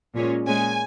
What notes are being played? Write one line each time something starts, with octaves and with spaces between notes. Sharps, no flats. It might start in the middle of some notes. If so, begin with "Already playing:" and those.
A#2 G#3 C#4
A#2 G#3 C#4 G#5